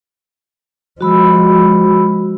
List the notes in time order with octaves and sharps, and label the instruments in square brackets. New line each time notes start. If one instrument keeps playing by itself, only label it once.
[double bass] F3 G#3 [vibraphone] F#4 B5 E6